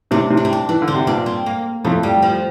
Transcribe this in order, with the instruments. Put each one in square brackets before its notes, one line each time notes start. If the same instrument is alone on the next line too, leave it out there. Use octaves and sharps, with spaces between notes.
[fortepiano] A2 C3 [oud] D4
[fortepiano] A2 C3
[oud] D4
C4
D4
[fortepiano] E3 [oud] D4
[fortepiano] D3
[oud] C4
[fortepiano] C3
[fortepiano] G2 A#2 [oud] D4
[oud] C4
A#3
[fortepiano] F2 A2 [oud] A3
[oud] G3
F3